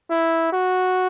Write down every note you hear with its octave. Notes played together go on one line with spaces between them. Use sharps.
E4
F#4